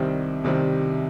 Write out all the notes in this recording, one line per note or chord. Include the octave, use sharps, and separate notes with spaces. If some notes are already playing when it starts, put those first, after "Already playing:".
Already playing: C2 C3 D#3 G3 C4
C2 C3 D#3 G3 C4